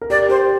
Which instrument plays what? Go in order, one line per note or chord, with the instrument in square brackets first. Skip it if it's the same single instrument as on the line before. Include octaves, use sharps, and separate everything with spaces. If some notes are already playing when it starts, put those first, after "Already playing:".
[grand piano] A#4
[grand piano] G4 [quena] D5
[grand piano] G4 [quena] C5